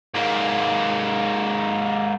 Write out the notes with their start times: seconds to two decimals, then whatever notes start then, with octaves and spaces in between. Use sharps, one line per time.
0.15 G#2 A#3